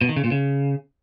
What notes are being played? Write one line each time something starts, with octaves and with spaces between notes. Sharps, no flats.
B2
D#3
C#3
A#2
C#3